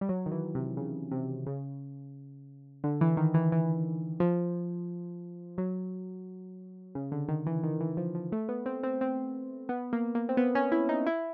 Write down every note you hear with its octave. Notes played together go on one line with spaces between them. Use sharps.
G3
F#3
D#3
E3
C3
C#3
C3
C#3
D3
E3
D#3
E3
E3
F3
F#3
C#3
D3
D#3
E3
D#3
E3
F3
F3
A3
B3
C4
C4
C4
B3
A#3
A#3
C4
B3
C#4
E4
D#4
E4